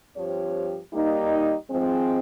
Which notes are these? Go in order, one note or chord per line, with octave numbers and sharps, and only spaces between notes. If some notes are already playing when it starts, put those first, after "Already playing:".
G2 F3 C4 G4 C#5
G3 A#3 D#4
G#2 F3 G#3 C4